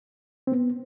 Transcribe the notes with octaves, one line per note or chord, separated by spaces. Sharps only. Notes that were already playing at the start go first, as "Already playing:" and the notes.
C4
B3